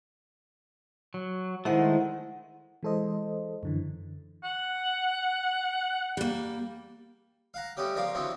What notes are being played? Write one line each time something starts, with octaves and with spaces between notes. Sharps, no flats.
F#3
D#3 G#3 A3 E4 C5 F#5
E3 G#3 A4 C5 D#5
F#2 D3 E3
F#5
G3 A#3
F5 F#5 A#5
G3 A3 B3 C#4 G4
C#2 F3 A#4 D5 F5
D3 E3 F#3 B3 C4 E4